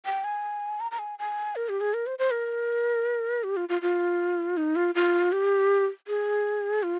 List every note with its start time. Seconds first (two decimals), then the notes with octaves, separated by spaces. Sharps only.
0.05 G5
0.24 G#5
0.80 A#5
0.91 A#5
0.99 G#5
1.19 G#5
1.56 A#4
1.69 G4
1.80 G#4
1.94 A#4
2.07 C5
2.19 C5
2.31 A#4
3.44 G4
3.57 F4
3.69 F4
3.82 F4
4.57 D#4
4.76 F4
4.95 F4
5.32 G4
6.08 G#4
6.83 F4